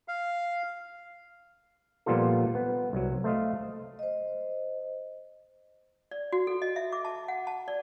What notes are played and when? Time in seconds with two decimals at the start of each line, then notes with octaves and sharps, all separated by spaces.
0.08 F5
2.06 A#2 F3 G3 B3 F4 A4
2.55 B3
2.93 C2 F#3
3.24 A3 C5 D#5 F5
3.99 C5 D#5
6.11 D5
6.32 F#4
6.47 A4
6.62 D#5
6.76 E5
6.93 D6
7.05 A5
7.28 F#5
7.47 A5
7.68 D5